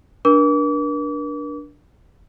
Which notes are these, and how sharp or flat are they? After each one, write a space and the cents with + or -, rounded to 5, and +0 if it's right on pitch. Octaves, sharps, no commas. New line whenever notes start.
D4 +0 A#4 +45 D6 -40